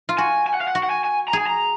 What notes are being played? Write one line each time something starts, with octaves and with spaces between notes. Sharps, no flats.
F4
F#4 G#5
G#5
F#5
F5
F#5
F#4
F#5
G#5
G#5
A#5
G#4 G#5
A#5